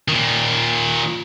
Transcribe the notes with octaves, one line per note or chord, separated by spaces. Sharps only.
A#2 D#3